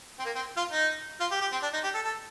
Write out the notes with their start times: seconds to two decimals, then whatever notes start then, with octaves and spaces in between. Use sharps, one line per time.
0.19 C4
0.25 A#3
0.36 C4
0.57 F4
0.72 D#4
1.20 F4
1.31 G4
1.41 G4
1.52 C4
1.63 D4
1.73 D#4
1.84 G4
1.94 A4
2.05 A4